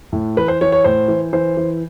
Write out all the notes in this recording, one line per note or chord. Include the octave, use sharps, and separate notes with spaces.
A2
E3 B4
C5
E3 C#5
C#5
A2 C5
E3
E3 C5
E3